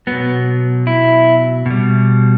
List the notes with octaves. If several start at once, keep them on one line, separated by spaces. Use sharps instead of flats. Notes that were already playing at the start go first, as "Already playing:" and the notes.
B2 F#3 B3
E4
B2 G3